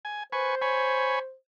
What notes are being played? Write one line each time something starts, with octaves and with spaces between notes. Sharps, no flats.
G#5
B4 C5 G#5 C#6
C#5 G#5 B5